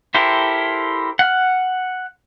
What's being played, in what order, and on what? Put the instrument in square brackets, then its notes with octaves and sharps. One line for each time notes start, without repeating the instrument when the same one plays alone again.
[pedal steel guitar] E4 G4 A4 A#4 C5
F#5 F6